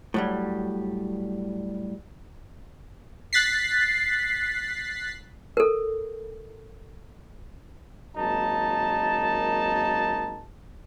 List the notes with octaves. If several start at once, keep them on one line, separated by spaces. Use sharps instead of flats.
A2 F#3 G3
F#6 A6 B6 C7
A4 A#4
G#1 F#2 A#3 D#4 A5